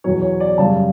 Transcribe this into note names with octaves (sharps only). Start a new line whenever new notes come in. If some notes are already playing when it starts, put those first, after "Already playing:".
E2 B2 F#3 C#5
C#5
D5
F#2 C#3 G3 A5